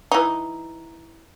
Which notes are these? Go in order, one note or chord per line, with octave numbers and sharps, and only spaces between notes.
E3 D#4